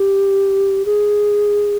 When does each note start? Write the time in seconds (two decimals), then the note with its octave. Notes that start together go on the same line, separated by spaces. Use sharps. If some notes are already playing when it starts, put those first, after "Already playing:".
Already playing: G4
0.85 G#4